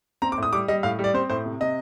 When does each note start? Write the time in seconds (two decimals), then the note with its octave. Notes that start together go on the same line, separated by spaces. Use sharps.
0.22 C4 A#5
0.32 D6
0.38 A2 D#6
0.53 G3 D6
0.68 G3 D#5
0.83 A2 F5
0.99 G3
1.04 D5
1.14 C4 C5
1.30 A2 C5
1.45 C3
1.61 C3 D#5